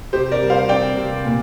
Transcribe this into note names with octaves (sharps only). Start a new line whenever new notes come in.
C3 G4 C5
A#4 D5
G3
C5 F5
C4 D5 G5
C3
A#2